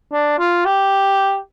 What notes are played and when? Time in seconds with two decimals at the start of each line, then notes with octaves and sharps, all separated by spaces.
0.12 D4
0.38 F4
0.65 G4